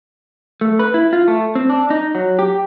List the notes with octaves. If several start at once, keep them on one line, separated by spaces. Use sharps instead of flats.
A3
B4
E4
F4
A3
C4
D4
D#4
F#3
G4